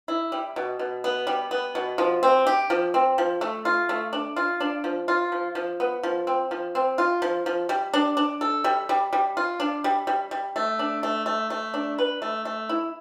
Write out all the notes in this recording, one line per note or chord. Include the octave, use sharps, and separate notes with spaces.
E4
G3
B2
B2
B3
G3
B3
B2
F3
C4
G4
F3
C4
F3
A3
F4
A3
D4
F4
D4
F3
F4
F3
F3
B3
F3
C4
F3
C4
F4
F3
F3
G3
D4
D4
A4
G3
G3
G3
F4
D4
G3
G3
G3
A3
D4
A3
A3
A3
D4
B4
A3
A3
E4